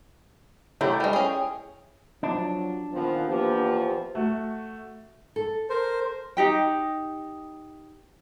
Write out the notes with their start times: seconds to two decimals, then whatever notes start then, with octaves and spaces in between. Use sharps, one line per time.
0.81 F#3 A3 E4 G4
1.00 G3 G#3
1.13 C#4 G#4 G5
2.23 F3 F#3 D4
2.93 A#2 D#3 F3 B3 C4 F4
3.28 E2 F3 A#3 G4 B4
4.15 A3 F#4
5.36 A4
5.70 A#4 C5
6.37 D#4 G4 G5